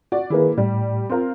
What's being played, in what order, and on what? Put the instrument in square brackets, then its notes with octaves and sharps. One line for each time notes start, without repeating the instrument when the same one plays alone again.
[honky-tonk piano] F#4 D5
[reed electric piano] D#3 G#4 B4 [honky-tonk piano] A#3 E4
[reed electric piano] A2 [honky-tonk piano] G3
[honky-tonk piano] C4 F4 A#4